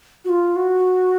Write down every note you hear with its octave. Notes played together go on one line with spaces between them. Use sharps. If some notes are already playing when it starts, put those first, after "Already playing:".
F#4
F4
F#4